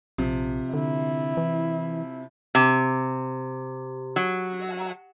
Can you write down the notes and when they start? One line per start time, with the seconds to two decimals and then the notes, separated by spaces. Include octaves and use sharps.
0.18 A#1 C3 F3
0.74 D3 E4
1.37 E3
2.55 C3
4.16 F#3